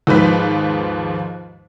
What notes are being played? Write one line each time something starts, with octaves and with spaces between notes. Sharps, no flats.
D#2 G#2 F3 B4 B6